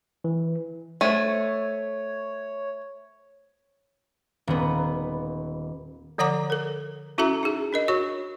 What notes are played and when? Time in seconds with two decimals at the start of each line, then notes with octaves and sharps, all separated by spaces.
0.24 E3
1.01 A3 C5 C#5 G#6 D#7
4.47 D#1 B3
6.18 D3 F3 C#5 F#5 A#5 D6
6.50 A4 A#4
7.18 C#4 E4 F#4 A4 E5 A#5
7.43 D#4 G#4
7.73 D4 A#4 D#5
7.88 F#4 C#5 C#6